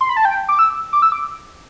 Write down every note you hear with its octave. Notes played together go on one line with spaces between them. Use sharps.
C6
B5
A5
G5
D6
E6
D6
E6
D6